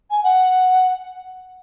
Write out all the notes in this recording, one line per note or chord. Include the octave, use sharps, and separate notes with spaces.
G#5
F#5